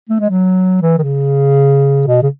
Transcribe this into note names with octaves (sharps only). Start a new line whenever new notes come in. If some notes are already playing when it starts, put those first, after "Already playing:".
A3
G#3
F#3
E3
D#3
C#3
B2
C#3